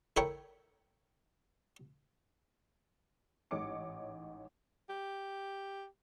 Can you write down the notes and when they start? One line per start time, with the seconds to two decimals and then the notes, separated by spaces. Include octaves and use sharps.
0.16 E4 A4 A#4 C#5 G5 B5
3.51 A1 G#2 C#5 D#5 D6 C#7
4.89 G4